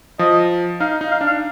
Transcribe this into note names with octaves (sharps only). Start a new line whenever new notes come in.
F3 D#5
D#4 F5
D#4
F5
D4
F5